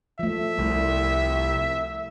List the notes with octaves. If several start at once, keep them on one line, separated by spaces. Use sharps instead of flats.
F3 A3 E5
C2